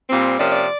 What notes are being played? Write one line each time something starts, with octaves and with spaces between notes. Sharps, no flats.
A#2 G3 C4
C3 F3 A#3 C#4 D5
D5